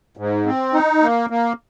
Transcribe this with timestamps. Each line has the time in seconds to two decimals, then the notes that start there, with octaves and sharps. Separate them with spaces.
0.17 G#2
0.46 C4
0.74 D#4
1.02 A#3
1.30 A#3